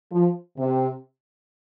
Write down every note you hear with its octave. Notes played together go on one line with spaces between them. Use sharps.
F3
C3